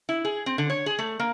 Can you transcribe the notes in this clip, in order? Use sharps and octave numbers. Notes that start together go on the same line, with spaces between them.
E4
G#4
C4
D3
C#5
G#4
A3
A#3